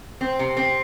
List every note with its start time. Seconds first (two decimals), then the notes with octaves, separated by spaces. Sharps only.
0.21 C4
0.39 C3
0.57 C4